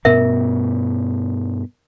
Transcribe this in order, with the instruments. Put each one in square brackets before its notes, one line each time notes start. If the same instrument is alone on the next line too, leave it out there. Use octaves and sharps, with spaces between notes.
[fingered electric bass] G2 B2 B3 [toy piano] A#4 E5